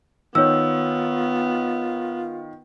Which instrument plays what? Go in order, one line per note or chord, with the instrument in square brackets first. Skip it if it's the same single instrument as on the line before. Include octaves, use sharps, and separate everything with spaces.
[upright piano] D#3 [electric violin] B3 [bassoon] F4 [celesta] C#5 E6